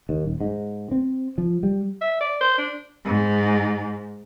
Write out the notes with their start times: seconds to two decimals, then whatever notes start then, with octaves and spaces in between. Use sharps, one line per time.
0.09 D#2
0.25 D#1
0.41 G#2
0.91 C4
1.38 F3
1.63 G3
2.01 E5
2.21 D5
2.41 C5
2.58 D4
3.05 G#2